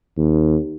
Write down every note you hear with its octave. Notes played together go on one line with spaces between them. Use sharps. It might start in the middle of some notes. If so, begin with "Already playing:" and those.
D#2